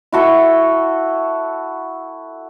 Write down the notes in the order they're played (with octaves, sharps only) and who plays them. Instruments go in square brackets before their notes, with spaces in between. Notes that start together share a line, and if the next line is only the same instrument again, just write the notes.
[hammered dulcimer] E4 F#4 A4 E5